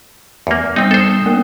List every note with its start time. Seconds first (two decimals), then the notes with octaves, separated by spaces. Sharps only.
0.47 E2 A#3
0.76 G3 B3 C4 D#4 D#6
0.91 A4 C5
1.26 A#3 B3 A#4